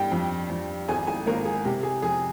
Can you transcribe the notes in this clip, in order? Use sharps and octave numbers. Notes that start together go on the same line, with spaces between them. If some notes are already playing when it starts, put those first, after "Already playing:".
Already playing: G2 G5
F2
F2
G#1 G#4 G#5
G#4 G#5
G#1 A#3 A#4
G#4
C3 G4
G#4
F2 G#4